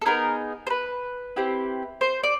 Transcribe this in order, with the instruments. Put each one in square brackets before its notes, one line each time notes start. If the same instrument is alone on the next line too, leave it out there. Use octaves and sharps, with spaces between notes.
[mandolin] A4
B3 D#4 G#4 A#4
C5
B4
C4 E4 G4
C5
D5